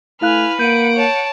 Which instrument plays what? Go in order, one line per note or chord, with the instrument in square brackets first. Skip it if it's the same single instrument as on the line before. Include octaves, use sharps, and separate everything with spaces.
[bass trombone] A3 [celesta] E4 F5 F#6 [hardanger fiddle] B4 [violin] G#5 F6
[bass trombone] A#3 [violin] F#5 D7 [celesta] G6 D#7
[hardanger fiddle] C#5 A5